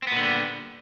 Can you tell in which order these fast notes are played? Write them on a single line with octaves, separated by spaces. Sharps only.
C4 B3 A#2 D3 G3